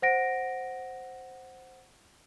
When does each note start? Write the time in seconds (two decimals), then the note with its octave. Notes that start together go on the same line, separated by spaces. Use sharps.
0.02 C5 F#5 A#6 D7